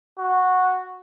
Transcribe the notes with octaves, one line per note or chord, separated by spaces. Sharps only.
F#4